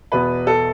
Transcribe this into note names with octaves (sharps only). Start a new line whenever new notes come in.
E2 B2 B3 B4
A4